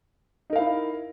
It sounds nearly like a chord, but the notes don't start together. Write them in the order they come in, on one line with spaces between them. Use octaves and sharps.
D#4 A#4 F5 E4